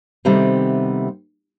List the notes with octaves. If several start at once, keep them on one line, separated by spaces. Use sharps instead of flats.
C3 D#3 G3 A3 B3 C4